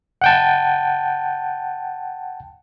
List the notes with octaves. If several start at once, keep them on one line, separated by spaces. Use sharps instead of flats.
F#5 G5 A5